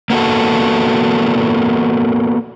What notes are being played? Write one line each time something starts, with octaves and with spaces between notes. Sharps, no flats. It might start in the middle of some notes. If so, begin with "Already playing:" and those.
A#3 B3 F#4 A4